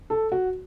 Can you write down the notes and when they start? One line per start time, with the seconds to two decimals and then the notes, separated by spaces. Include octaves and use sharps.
0.10 A4
0.32 F#4